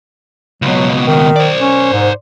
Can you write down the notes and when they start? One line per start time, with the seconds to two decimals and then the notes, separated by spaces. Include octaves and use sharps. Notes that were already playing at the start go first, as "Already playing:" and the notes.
0.62 C#2 B2 F#3
1.06 D#3
1.36 C5 D5
1.61 C#4
1.93 G#2